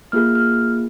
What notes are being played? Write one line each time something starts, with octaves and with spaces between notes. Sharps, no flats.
A#3 F4 G#4 F6
F6